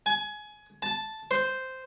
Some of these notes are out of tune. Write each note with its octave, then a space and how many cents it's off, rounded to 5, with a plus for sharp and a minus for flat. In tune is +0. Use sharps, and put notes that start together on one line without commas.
G#5 +20
A5 -5
C5 -5